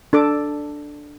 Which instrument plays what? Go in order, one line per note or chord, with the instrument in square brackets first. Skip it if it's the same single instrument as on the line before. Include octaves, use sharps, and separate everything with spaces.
[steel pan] D4 A4 D6